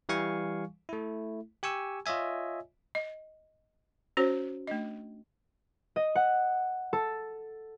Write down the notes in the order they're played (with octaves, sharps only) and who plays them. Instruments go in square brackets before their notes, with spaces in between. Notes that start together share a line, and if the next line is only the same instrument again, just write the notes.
[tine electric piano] E3 G3 F5 G#5 C#6
A3 E4
G4 G#5 C#6 E6
F4 C#5 D#5 E5 G#5
[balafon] D#5
C#4 F#4 C5 C#5
A3 D4 D#5
[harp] D#5
F#5
A4